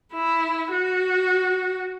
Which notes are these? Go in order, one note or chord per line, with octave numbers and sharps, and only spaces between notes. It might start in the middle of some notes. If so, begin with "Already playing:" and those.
E4
F#4